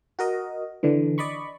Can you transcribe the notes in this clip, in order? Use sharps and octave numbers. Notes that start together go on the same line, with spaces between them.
F#4 A#4 D#5
D3 E3
D5 D#5 B5 C#6